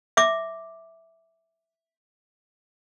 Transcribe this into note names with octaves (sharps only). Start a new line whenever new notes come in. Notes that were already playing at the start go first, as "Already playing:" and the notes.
E5 D6